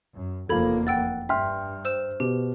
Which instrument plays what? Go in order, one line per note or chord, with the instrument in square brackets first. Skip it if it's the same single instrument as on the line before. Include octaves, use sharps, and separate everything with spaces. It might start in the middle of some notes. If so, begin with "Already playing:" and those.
[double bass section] F#2
[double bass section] F1 E2 A#3 [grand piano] F3 A4 [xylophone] B5 G#6
[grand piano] F#5 [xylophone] G5 E6 A6
[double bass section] G2 [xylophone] E5 [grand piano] G5 C6 F6
[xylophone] C5 E6 E7
[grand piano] B2 [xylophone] G4